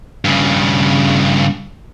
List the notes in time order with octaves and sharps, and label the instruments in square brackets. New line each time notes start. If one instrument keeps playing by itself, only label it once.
[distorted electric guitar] G2 C#3